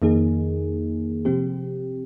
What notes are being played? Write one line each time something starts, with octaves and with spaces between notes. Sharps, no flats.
F2 D#3 A#3 D#4 G#4
C3 F3 C4 G4